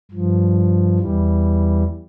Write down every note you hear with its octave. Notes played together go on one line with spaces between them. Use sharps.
G2 F3
E2 E3 G3